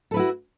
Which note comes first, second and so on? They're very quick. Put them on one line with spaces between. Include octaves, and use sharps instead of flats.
A4 B4 E4 F#4